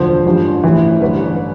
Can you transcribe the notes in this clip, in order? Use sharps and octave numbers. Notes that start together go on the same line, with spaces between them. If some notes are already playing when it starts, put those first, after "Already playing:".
Already playing: E1 D2 D3 F3 C5
A1 G2 F3
A1 A2 E3
A1 G2 D3 B4